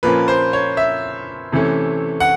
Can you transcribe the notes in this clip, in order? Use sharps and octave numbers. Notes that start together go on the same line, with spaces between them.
A#2 F3 A#3 C#4 B4
C5
C#5
E5
C3 E3 A3 C#4
F#5